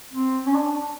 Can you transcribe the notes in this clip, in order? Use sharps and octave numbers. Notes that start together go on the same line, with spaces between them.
C4
C#4
D4